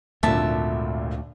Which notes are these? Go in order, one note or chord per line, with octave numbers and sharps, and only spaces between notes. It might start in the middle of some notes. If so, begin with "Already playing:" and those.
G#1 D2 A#2 D3 E5 A5